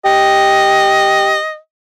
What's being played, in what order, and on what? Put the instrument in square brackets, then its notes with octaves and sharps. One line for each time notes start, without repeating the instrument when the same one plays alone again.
[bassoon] G4 [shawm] D#5